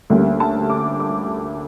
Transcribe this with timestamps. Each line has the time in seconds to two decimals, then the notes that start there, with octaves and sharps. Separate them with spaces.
0.10 D2 D3 G3 A#3 C#4
0.40 A5
0.70 D6
1.00 D6